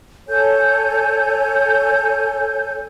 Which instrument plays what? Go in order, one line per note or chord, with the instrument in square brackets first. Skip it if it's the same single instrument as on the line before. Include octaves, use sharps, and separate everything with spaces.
[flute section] A4 C#5 G#5 G6